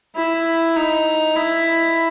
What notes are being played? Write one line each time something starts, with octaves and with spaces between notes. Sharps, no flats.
E4
D#4
E4